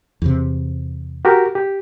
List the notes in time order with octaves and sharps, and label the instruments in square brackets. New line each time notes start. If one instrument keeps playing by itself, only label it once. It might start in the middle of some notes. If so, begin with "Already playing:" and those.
[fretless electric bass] E2 C3
[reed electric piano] F#4 G4 A#4
G4